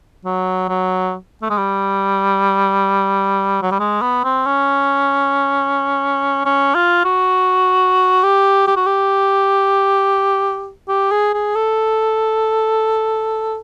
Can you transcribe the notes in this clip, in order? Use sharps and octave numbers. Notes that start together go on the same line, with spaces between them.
F#3
F#3
A3
G#3
G3
F#3
G3
G#3
B3
C4
C#4
C#4
F4
F#4
G4
G4
F#4
G4
G4
G#4
G#4
A4